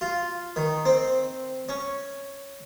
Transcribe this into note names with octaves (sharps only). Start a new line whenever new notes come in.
F4
D#3
C4
C#4